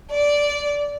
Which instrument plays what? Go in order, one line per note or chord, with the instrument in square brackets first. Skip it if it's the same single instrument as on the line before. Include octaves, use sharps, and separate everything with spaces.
[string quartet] D5